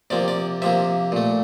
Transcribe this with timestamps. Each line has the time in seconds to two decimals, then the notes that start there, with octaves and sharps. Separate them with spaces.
0.10 C3 F3 A#3 D5
0.28 D5
0.62 C3 F3 A#3 E5
1.12 A#2 A3